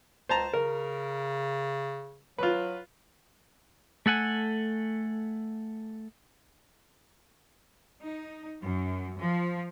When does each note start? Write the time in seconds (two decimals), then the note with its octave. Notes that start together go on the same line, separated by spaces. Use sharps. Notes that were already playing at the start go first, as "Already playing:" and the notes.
0.29 C#2 C5 A5 A#5
0.53 C#3 A#4
2.38 F#3 F4 B4
4.06 A3 A4 F#5 G#5
8.01 D#4
8.59 F#2
9.19 F3